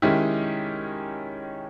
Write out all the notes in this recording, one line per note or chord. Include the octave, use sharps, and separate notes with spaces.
D#3 G#3 C#4 E4 G4